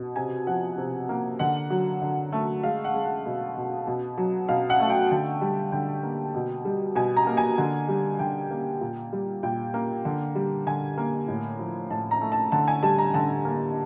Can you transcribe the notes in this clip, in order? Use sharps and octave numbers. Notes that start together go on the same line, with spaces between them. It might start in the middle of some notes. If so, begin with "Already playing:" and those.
Already playing: B2
C3 G#5
F3 F#5
C3
A#3
D3 F#5
F#3
D3
A3
G#3 F5
F#5
G#3
F#5
B2
B2
B2
F#3
B2 F5
F#5
A3
G5
D3
G3
D3 G5
A#3
B2
G3
B2 G#5
A#5
A#3
G#5
D3
G3
D3 G5
A#3
A#2
G3
A#2 G5
A#3
D3
G3
D3 G#5
A#3
A2
F3
A2 A5
A#5
A3
A5
D3 A5
G#5
G3 A5
A#5
D3 A5
A#3